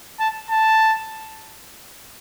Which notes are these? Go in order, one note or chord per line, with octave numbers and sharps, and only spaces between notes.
A5
A5